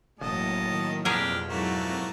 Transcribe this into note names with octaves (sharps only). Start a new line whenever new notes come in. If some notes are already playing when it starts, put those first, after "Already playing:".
E1 A2 F#3 A#3 D#5 A5
D#3
F2 B2 D4 G4 G#4 A#4 F6
G#2 F#3 A3 A#3 E4 F#4